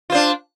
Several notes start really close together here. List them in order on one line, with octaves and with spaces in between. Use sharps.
F4 C5 D4